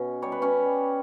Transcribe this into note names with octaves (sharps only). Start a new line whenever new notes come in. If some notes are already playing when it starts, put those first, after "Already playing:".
Already playing: B2 C#4
G3 C#5
B4
C#4 C#5
G3